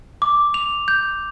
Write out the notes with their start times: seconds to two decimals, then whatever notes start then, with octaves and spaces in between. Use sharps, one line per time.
0.22 D6
0.54 F7
0.88 G6